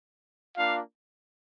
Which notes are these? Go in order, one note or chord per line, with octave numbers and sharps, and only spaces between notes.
A#3 D4 F4 F5